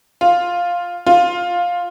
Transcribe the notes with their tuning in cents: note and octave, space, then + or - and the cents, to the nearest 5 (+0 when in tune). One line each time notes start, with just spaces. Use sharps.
F4 +5
F4 +10